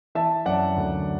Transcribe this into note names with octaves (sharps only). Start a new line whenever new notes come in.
E3 E5 A5
F#2 D5 F#5
D2